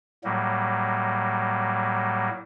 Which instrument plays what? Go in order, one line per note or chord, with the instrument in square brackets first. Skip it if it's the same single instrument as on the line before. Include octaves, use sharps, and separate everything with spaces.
[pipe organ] A2 F#3 G3 A#3